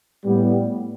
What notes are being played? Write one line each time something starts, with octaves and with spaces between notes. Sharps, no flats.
A2 G3 B3